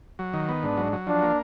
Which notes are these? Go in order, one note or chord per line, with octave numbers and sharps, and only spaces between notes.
F#3
D#3
B3
G#2 D4
F#3
F#3
F3 D4
A#3